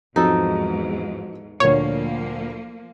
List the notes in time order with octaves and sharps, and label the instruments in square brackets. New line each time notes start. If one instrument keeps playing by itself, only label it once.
[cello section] E2 G#2 [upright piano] F3 F#3 C4 [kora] D#4 A4
[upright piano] D2 A#2 [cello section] F3 A#3 [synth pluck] C#5